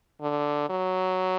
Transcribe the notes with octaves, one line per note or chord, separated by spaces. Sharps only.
D3
F#3